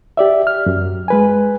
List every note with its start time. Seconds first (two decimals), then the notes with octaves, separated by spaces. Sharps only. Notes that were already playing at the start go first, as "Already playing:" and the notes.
0.17 G4 D5 E5
0.47 F6
0.66 F#2
1.08 G#3 B4 G#5